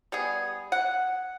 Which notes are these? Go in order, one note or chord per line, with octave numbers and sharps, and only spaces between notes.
G3 B3 G#4
F#5